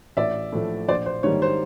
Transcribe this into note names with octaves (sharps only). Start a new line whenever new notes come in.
A1 D5 E5
A2 F3 A3
A#1 C5 D5
C5
G#2 D#3 G3 A#3 C#5
C5